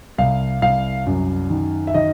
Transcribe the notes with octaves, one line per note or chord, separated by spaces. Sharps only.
C2 F5
C2 F5
F#2
D#3
E5
D#3 D#5